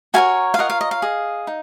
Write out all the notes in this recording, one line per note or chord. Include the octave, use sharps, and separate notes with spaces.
F#4 A#4 C#5 F5 G#5
F5
F4 A#4 C#5 D#5 F#5
F5
D#5
F5
G#4 D#5
D#4